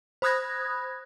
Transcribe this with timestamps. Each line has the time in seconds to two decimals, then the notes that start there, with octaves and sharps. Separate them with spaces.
0.22 C5 B5 D#6 F#6 G#6 A#6